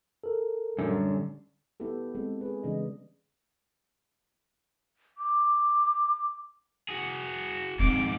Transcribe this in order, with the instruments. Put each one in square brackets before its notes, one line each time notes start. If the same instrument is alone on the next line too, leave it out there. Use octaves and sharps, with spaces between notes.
[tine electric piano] A4 A#4
[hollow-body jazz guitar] F#2 [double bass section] A2 F#3 G3 [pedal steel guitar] D3
[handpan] B3 E4 G4 A4
G#3 C4 A4
G#4 B4
C#3 E3 G#3 D4 D#5
[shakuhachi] D6
[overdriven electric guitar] F#4 G#4
[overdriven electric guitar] F2 G#2 [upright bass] C4 C#4 [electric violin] D6